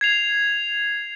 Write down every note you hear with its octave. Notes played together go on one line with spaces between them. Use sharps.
G#6 C7 F7